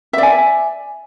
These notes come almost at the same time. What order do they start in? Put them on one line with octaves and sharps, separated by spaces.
E5 D5 G#5